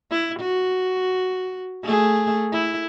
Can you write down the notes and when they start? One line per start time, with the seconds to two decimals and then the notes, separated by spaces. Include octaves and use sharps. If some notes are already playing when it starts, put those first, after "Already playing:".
0.11 E4
0.40 F#4
1.83 A3 G#4
2.52 E4